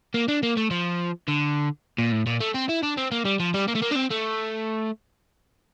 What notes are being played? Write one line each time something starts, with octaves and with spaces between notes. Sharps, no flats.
A#3
D4
A#3
A3
F3
D3
A#2
A2
A#2
A3
C4
E4
D4
C4
A#3
G3
F3
G3
A#3
A3
A#3
D4
C4
A3